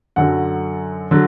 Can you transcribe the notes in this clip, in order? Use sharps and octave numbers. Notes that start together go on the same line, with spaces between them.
F#2 D3 F#3 F#5
D3 F#3